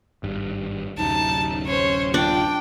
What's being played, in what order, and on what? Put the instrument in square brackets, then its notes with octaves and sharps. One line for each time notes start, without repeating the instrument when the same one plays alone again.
[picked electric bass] G#1 G2
[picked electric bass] D1 F#2 C3 [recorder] D#4 [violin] A5
[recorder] C#4 [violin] C5 C#5
[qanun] D4 [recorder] F4 [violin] G5